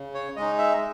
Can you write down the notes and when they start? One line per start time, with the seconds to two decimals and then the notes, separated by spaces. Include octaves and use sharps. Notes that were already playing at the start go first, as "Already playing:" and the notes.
Already playing: C#3
0.15 C#5
0.36 G#3 D#4 D#5
0.58 E5